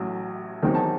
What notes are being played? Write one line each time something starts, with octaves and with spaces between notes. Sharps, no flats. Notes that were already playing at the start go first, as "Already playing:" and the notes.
Already playing: A1 A2 F#3
E2 D#3 F#3 C4 D#4 G5
A5